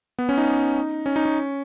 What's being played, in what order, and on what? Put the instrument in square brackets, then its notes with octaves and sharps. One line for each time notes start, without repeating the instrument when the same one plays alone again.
[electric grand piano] B3
C#4
D#4
C#4
D#4
C#4